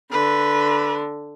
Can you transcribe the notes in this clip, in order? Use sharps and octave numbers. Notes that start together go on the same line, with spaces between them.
D3 B4